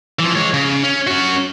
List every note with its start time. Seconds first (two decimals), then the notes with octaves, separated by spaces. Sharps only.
0.19 E3 F3
0.35 G#3 C#5
0.54 C#3
0.83 C#4
1.07 C#4 F#4